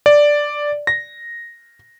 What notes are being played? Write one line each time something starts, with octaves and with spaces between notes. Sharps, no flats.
D5
A#6